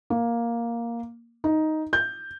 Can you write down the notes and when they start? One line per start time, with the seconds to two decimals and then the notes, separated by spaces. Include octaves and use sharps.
0.10 A#3
1.44 D#4
1.93 G6